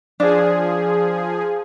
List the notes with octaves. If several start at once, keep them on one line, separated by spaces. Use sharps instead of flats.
F3 D4 G#4